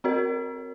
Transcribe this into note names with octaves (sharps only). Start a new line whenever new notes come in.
C4 F#4 A#4 C#5